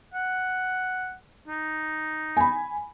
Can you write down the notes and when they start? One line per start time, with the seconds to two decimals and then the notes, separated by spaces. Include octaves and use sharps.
0.14 F#5
1.48 D#4
2.37 G#5 B5